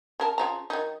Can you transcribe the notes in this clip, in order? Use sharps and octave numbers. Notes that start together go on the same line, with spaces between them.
C#3 A#4 A5
C#3 F3 A#5
D#3 F#3 D#4